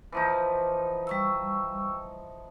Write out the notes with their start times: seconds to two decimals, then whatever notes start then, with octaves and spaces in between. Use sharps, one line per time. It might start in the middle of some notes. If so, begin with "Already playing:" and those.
0.12 E3 F3 D#4
1.07 G3 C#6 E6